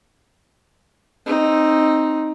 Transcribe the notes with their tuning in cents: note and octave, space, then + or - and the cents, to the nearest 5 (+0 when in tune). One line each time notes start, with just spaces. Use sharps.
C4 +10 D#4 +0